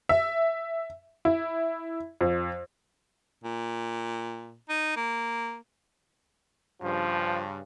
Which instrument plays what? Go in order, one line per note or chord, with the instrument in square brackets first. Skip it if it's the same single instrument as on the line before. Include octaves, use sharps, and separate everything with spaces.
[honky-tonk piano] E5
E4
F2
[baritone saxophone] A#2
D#4
A#3
[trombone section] G2 C#3 [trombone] F3